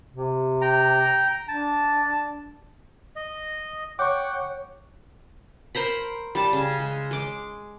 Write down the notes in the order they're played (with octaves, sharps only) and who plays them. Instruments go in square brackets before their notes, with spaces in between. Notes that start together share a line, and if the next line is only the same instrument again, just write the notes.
[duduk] C3
[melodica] G5 A#5
[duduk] D4 [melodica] A5
[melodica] D#5
[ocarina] C#5 [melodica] F#5 G5 [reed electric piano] C#6 D6
[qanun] A#4 C5 A#5 B5
G3 A5
C#3
G#3
G#3 D6